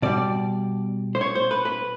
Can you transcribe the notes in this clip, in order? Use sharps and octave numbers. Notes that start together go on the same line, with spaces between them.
B2 G3 D5
C5
C#5
C5
B4
B4